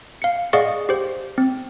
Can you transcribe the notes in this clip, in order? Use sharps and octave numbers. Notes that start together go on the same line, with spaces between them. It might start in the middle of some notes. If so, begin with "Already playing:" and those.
F5 C#7
G#4 D5 D#5 F5 F#5 C#6
G4 C5
C4